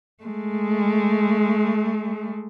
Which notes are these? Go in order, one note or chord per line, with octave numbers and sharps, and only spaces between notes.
G#3 A3